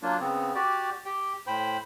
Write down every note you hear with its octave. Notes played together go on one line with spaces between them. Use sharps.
F#3 A#3 D4 F4
C#3 B3 C4
F#4 G4 D5
G4 G5
A2 C5 G5 B5